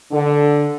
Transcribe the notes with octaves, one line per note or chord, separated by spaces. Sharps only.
D3